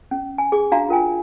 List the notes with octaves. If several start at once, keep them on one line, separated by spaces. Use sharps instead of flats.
C#4
G#5
G#4 D6
D4 F#4 F5 A#5
F4 A#4 G5 G#5